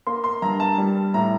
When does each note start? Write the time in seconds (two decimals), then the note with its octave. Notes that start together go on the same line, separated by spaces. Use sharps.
0.07 A#3 C6
0.24 C6
0.42 G2 A#5
0.60 A5
0.78 G3
1.14 A2 A#5